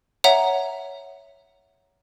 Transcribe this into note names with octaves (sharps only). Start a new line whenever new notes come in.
C#5 E5 F#5 A#5